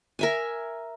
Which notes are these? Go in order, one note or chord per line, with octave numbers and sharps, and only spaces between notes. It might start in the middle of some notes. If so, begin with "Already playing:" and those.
A#4 E5 G#5